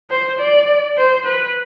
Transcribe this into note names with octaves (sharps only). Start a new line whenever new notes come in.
C5
D5
C5
B4